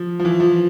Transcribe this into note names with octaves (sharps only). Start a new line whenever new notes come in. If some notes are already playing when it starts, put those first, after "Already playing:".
Already playing: F3
F3
E3
F3